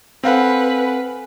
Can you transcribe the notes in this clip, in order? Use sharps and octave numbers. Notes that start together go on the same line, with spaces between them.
C4 A4 B4 F5 F#5 G#5